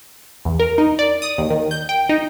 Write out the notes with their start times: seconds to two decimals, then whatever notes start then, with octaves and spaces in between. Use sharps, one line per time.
0.45 E2
0.60 A#4
0.78 D#4
0.99 D5
1.22 D#6
1.38 D#2
1.50 D#3
1.71 G6
1.89 G5
2.09 D#4